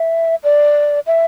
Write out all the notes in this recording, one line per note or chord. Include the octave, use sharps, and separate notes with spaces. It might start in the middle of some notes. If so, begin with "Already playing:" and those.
Already playing: E5
D5
E5